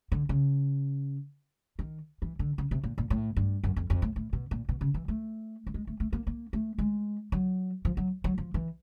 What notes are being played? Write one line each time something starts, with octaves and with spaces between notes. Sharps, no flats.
D3
C#3
D#3
E3
D3
C#3
C3
A#2
A#2
A2
G2
F#2
F2
F2
A2
A2
B2
A#2
B2
C#3
E3
A3
A3
G#3
A3
A3
A#3
A#3
A3
G#3
F#3
F3
F#3
F#3
F3
E3